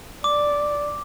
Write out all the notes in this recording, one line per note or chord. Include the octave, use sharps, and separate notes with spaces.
D5 D6